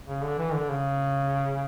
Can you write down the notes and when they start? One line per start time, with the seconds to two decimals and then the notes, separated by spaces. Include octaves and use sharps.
0.07 C#3
0.23 D3
0.39 E3
0.54 D3
0.70 C#3